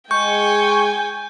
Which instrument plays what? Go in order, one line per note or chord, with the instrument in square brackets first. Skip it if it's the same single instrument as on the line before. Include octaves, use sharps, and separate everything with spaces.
[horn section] G#3 [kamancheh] G5 G#5 [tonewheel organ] C#6 [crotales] G6